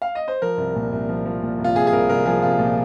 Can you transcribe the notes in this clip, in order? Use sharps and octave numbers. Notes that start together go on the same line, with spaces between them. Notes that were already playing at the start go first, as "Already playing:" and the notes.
F5
D#5
C5
F3 A#4
C2
A#2
C2
F3
F3
A#2
C2
F4
C2 G#4
G#4
C2 A#4
C2 A#4
F3 G#4
C2 F4
A#2